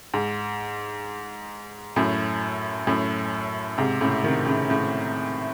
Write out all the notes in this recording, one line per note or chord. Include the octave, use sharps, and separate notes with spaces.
G#2
F#2 A2
F#2 A2
G#2 C3
A2 C#3
C3 D#3
A2 C#3
A2 C#3